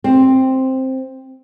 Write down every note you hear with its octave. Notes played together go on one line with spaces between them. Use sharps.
C4